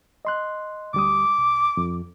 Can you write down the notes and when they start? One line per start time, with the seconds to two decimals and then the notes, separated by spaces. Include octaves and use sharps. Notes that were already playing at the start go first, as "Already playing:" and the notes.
0.25 D#5 C6 F#6
0.94 D2 G3 D6 D#6
1.38 C2
1.77 F2